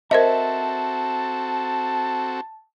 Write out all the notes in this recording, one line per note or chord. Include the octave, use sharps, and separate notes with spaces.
C4 F#4 A4 A#4 C5 D#5 E5 A5